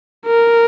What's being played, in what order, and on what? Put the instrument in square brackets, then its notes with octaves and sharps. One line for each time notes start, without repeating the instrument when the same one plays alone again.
[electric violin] A#4